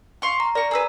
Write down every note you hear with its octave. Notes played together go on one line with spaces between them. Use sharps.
F5 C6 C#6
A#5
A#4 D5 C#6
G#4 B4 A#5 E6